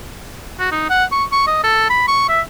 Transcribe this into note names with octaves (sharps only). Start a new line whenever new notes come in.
F#4
D#4
F#5
C#6
C#6
D#5
A4
B5
C#6
E5